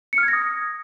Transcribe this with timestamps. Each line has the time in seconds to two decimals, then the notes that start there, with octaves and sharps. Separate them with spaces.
0.13 C#7
0.18 F6
0.23 G#6
0.28 A#6
0.33 D#6